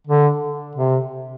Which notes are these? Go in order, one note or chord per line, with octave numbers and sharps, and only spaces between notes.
D3
C3